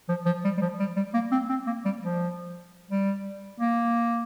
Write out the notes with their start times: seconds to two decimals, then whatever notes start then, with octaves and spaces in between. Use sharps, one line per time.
0.09 F3
0.26 F3
0.45 G3
0.58 G3
0.62 F3
0.80 G3
0.96 G3
1.14 A#3
1.32 C4
1.49 C4
1.67 A#3
1.85 G3
2.02 F3
2.91 G3
3.60 A#3